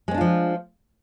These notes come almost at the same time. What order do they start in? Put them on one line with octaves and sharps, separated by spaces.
G#3 C4 D4 F4 F3